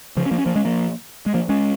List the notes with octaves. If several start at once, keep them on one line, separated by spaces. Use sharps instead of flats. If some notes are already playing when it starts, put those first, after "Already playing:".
C#3 F3
C#4
F3 A#3
C#4
F3 A#3
G#3 C#4
F3 A#3
G#3
F3 A#3
G#3 C#4